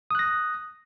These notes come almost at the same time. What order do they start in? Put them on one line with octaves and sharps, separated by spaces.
D#6 F#6 A#6